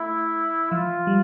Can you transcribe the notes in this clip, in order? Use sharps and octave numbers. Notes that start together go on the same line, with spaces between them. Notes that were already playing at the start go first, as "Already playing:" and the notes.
Already playing: A3 E4
F3 F4
G3